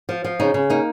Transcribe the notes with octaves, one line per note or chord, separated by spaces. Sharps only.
F3
F3
C#3 D#4
C#3
A#3 D#4